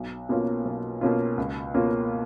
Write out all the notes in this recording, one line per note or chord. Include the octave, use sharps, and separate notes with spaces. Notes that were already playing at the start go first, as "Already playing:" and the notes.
Already playing: B1
B2 A#3 C#4 F4
B1
B2 A#3 C#4 F4
C#2
B2 A#3 C#4 F4